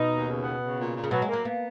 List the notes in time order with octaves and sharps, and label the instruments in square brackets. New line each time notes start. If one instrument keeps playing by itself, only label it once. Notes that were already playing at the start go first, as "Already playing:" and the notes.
Already playing: [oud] B2 [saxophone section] D#4
[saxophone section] D#2
C#3
B3
C#3
A#2
A#2
[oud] C#3
[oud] B2 [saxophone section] F#3
[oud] G#3
[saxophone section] A#3
[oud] F#3
[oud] A#3 [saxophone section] B3